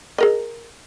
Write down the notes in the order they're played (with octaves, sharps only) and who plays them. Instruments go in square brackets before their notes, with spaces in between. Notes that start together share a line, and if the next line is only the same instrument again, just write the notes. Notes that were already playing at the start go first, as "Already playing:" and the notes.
[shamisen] G#4 A#4 D#5